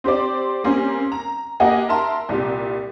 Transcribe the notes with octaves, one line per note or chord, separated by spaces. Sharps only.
C4 G4 C5 D5
G3 A#3 C4 C#4
A#5
A#3 F#4 G4 D#5 F#5 G#5
A#4 E5 A5 A#5 C6
C2 A#2 G4